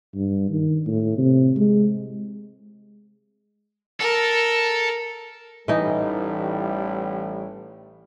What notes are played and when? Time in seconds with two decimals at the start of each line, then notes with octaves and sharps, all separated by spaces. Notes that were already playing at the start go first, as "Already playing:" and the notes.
0.14 G2
0.50 D#3
0.87 A2
1.18 C3
1.57 G#3
4.00 A4 A#4
5.68 A1 A2 E3 G3 D#4